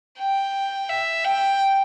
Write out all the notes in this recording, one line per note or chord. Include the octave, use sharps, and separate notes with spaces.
G5
E5
G5